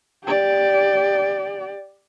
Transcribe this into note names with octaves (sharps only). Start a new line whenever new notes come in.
G4 D5